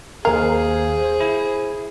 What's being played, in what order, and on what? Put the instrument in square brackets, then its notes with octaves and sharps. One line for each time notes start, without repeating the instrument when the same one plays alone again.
[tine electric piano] D#2 F5 [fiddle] G#4 [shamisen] A#4 [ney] C5
[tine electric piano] E4